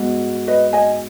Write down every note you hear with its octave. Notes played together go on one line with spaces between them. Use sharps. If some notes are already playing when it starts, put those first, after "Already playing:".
Already playing: G#2 G#3 B3 F#4
B4 D#5
D#5 G#5